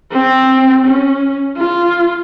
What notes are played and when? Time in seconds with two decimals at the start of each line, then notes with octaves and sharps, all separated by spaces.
0.12 C4
0.87 C#4
1.57 F4